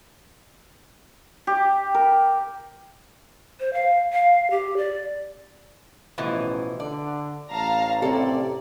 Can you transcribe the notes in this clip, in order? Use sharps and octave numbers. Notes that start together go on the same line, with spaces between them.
G4
A#4
C5
F5
F5
G4
D5
A1 B2 E3 F3
D3 D5
A1 F5 A5 A#5
C3 A#3 A4 D5